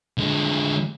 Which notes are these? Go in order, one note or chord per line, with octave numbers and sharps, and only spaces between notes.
D3 G#3